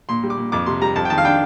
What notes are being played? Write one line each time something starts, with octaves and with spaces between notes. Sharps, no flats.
A#2 C6
G3
D6
A#2
F2 D6
C3 C6
G3 A#5
F2 A5
G5
D#3 A5
F5
D4 G5